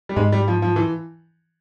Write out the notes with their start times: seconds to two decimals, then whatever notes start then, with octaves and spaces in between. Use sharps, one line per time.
0.09 G3
0.16 G#2 G#3
0.32 G3
0.48 F3
0.62 F3
0.76 E3